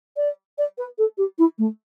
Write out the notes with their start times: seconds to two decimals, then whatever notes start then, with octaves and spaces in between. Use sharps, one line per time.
0.16 D5
0.58 D5
0.78 B4
0.98 A4
1.17 G4
1.38 E4
1.58 A3